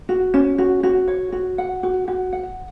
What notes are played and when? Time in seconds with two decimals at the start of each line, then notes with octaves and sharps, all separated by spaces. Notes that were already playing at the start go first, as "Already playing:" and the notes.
0.09 F#4
0.34 C#4
0.58 F#4
0.83 F#4
1.08 C#5
1.32 F#4
1.58 F#5
1.83 F#4
2.08 F#4
2.33 F#5